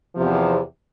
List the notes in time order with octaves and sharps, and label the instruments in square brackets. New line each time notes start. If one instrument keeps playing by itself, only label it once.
[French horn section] E2 C3 F3